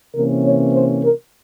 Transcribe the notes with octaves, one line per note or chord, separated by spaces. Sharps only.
C3 E3 A#3 C#4 A#4
C#5
C5
A#4